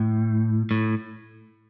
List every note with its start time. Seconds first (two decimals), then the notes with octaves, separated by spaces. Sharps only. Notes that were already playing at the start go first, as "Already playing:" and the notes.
Already playing: A2
0.71 A2